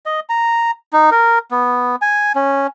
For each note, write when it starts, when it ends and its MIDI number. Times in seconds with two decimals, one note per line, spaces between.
0.06 0.20 75
0.29 0.71 82
0.93 1.10 63
1.11 1.39 70
1.51 1.96 59
2.02 2.32 80
2.35 2.67 61